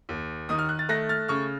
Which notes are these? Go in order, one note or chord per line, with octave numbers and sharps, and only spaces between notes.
D#2
D#3 D#6
F6
F#6
A6
A3 F#6 A#6
F6 A6
C#3 C#6 F6